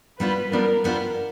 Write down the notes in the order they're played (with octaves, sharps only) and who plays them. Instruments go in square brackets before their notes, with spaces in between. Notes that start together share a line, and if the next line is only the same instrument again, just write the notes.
[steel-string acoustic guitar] G3 B3 D4 F4 [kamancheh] B4
[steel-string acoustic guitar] G3 B3 D4 F4 [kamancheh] A#4
[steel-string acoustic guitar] G3 B3 D4 F4 [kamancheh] A#4